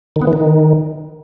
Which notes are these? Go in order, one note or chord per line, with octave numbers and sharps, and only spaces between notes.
D#3
B3
E3
D#3